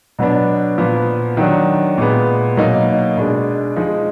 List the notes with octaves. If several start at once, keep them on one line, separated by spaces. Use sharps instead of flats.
B2 F#3 B3 D4
A#2 F3 B3
D#3 F#3 D4
A#2 G#3 B3
B2 F#3 A#3 D#4
B2 G#3 D4
F3 G#3 D#4